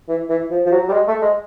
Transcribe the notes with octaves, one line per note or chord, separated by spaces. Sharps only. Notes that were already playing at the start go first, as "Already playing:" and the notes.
E3
E3
F3
F3
F#3
G3
G#3
A3
G#3